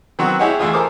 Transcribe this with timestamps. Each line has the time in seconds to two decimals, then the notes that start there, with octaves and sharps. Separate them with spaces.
0.19 D#3 F#3 B3 C4 F#4
0.39 E4 G4 G#4 C#5 D#5 F#5
0.59 D2 E3 E4 F4 G#4 D#6
0.73 A4 A#4 C5 G#5 D6 D#6